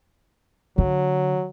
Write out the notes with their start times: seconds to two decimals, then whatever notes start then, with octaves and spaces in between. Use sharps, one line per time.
0.78 D3 F#3